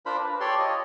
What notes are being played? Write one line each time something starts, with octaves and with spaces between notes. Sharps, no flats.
D4 F4 A#4 C5 B5
B4
G4 A4 C#5 D5 C6
F4 C#5 D#5